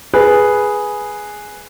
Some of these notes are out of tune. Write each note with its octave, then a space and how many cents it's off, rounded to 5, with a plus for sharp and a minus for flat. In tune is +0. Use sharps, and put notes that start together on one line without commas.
G#4 +0 B4 -5